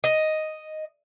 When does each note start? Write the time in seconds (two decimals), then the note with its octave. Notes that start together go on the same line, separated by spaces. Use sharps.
0.04 D#5